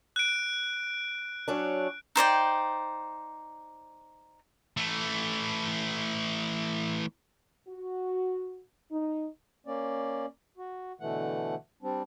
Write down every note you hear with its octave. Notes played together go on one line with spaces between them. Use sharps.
F#6 D7
F#3 C#4 D4
D#4 C5 D5 G5
E3 A3
F#4
D#4
A#3 C#4 D5
F#4
B2 D3 E3 A3 F#5
G3 C4 D4